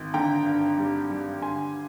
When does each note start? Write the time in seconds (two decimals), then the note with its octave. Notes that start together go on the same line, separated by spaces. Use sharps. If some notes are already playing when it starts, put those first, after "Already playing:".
Already playing: G#1
0.14 D3 G5 A#5
0.46 G2
0.78 G3
1.10 G3
1.42 D3 G#5 C6